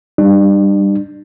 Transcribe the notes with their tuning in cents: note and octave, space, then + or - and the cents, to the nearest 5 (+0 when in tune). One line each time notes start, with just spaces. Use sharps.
G3 +0 D4 +35